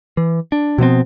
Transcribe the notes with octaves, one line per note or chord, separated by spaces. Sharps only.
E3
D4
B2 F3 B3 C4